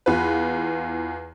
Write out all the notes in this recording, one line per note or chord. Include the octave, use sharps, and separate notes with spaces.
E2 F4 B4